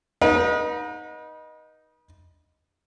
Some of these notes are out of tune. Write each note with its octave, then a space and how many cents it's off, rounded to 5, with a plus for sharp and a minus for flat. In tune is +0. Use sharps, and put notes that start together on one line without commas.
D#4 +0 B4 -40 F#5 -40